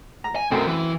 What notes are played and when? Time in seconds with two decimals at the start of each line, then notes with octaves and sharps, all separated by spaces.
0.24 A#5
0.36 G#5
0.51 F#2 B2 A3 C4 A#4
0.67 E3